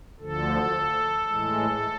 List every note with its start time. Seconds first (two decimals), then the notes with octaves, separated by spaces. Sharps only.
0.20 D2 D3 F3 A4
1.28 A2 E3 G#3